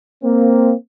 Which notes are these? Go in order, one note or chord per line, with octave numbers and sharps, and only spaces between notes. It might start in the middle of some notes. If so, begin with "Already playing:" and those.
A#3 C4